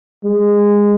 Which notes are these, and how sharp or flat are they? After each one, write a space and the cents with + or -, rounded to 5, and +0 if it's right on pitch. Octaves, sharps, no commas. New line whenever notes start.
G#3 -15